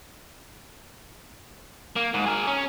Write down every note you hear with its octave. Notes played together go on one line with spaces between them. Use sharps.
A#3
G#2
G#4 A#4
C#4